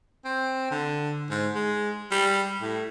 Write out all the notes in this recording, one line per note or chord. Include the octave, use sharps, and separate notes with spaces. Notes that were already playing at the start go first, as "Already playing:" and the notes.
C4
D3
G#2
G#3
G3
A2